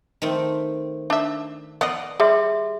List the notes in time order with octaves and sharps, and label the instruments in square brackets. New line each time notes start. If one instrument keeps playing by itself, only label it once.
[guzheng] D#3 A3 C4
[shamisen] D4 E5
[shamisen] B3 D#5 [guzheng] D5 F5 F#5
[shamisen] G3 [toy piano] G#4 E5 C6